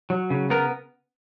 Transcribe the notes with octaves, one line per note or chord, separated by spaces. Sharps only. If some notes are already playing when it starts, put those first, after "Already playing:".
F#3
C#3
B3 A#4